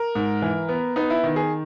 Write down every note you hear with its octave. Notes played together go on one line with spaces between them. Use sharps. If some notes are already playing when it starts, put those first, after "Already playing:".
Already playing: A#4
G#2
E3
B3
B3 D#4
E4
D#3
G#4